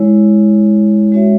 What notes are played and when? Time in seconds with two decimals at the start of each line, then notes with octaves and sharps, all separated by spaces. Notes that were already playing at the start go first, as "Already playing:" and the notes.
Already playing: G#3 E4 C#5
1.12 G#3 C#4 F#4 C#5 E5